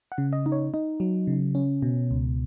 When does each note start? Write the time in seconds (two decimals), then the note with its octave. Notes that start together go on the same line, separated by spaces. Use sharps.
0.12 F#5
0.18 C#3
0.33 D#5
0.46 D#4
0.52 C#5
0.74 D#4
1.00 F#3
1.27 C#3
1.55 C#4
1.82 B2
2.11 C#2